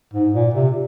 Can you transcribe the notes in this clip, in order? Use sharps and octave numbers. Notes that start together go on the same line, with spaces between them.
G#2
A#2
C3